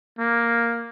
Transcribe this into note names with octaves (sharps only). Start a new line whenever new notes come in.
A#3